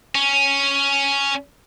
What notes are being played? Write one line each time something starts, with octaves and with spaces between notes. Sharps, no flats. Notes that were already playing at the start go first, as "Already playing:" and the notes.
C#4